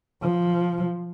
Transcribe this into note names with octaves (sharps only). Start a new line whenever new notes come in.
F3